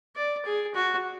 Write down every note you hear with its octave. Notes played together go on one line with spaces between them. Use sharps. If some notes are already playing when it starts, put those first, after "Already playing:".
D5
G#4
F#4